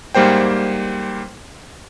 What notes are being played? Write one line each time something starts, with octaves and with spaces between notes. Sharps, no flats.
G#2 G3 A#3 C5 G5